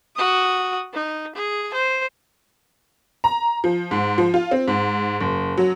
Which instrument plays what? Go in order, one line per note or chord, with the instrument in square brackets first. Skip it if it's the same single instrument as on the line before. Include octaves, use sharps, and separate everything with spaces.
[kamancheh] F#4 D#6
D#4
G#4
C5
[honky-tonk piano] A#5
F3
G#2
F3
F4
C4
G#2
F#1
F#3